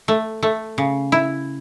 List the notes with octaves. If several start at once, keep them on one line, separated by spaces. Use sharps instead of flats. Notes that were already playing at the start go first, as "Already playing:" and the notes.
A3
A3
C#3
E4